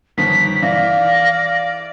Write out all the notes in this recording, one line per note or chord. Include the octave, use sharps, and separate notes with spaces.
G1 D#3 F3 B6
E3 D5 F5 A#6